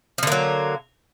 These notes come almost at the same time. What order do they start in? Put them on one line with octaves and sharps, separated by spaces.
F3 D3 A#3 F#3